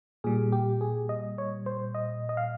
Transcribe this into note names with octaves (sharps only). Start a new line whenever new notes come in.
A#2 G3 G#4
G4
G#4
D#5
C#5
C5
D#5
D#5
F5